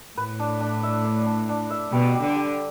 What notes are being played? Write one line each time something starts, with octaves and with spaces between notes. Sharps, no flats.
A2 B4
D4
D4
E5
D4
D4
D4
E5
B2 G3
G4
D3
G4